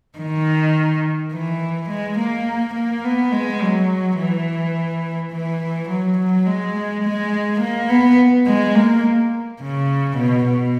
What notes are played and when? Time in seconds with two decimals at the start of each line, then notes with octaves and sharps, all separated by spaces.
0.18 D#3
1.32 E3
1.90 G#3
2.18 A#3
2.75 A#3
3.04 B3
3.32 G#3
3.61 F#3
4.18 E3
5.33 E3
5.89 F#3
6.18 F#3
6.47 G#3
7.04 G#3
7.61 A#3
7.89 B3
8.46 G#3
8.75 A#3
9.60 C#3
10.18 B2
10.46 B2